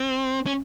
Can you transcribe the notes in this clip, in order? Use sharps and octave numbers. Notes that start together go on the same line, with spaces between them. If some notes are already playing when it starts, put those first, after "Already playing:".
Already playing: C4
C#4